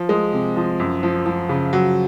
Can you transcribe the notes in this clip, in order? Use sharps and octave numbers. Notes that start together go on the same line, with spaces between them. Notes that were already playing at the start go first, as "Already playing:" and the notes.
Already playing: F3
G#3
C3
F3
F#2
F3
F3
C#3
F#3